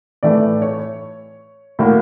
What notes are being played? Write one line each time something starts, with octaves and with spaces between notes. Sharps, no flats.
A2 E3 A3 D5
C#5
A2 F#3 A#3